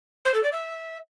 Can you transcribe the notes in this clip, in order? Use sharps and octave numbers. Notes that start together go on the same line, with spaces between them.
C5
A4
D5
E5